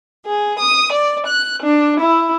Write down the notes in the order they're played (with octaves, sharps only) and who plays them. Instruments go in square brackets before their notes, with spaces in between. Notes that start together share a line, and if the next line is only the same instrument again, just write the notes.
[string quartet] G#4
D#6
D5
F#6
D4
E4